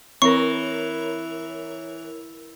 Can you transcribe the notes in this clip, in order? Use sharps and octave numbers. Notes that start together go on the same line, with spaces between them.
E3 C4 A#4 C#5 C#6